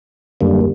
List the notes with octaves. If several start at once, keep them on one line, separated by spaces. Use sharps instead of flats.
F#2 D3 G3 A#3